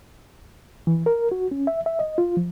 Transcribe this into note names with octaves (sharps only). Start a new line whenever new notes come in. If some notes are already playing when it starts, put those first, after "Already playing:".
E3
A#4
F#4
C#4
E5
E5
D#5
F4
F3